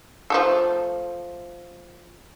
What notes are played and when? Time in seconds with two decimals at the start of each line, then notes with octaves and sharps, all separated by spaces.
0.30 F3 A3 A4